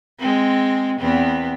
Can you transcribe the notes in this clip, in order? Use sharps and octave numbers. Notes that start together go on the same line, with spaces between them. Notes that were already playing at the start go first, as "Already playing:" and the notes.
G#3 C4
E2 B3 C4